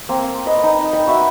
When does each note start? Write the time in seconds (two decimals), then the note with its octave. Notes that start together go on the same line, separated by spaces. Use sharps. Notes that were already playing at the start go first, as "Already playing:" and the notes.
0.09 A#3 C4
0.46 B4 D#5
0.63 D#4
0.93 G5 B5
1.07 F#4 B4 E5